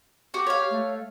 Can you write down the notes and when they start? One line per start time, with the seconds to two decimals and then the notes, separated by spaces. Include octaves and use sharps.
0.34 F#4 G4
0.47 C#5 F5
0.71 A3